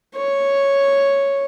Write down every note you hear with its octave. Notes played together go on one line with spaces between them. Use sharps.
C#5